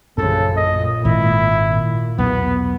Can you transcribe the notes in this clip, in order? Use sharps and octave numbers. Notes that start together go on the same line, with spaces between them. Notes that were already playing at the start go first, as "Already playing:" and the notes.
A#1 F#2 C#3 A4
A#2 D#5
G#1 E4
A#2
B1 E2 B3